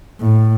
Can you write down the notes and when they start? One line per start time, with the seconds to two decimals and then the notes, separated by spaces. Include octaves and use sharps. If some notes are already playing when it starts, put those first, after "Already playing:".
0.21 A2